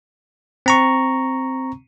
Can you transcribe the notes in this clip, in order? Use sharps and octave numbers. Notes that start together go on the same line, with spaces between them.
C4 A#5 C#6